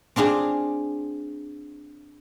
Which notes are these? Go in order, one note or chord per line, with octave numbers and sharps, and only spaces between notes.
C4 D4 F4 G#4